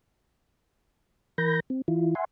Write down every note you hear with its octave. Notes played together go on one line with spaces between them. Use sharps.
E3 A#4 B5 G6 A#6
C4
E3 E4 F4
E5 F#5 G#5 C6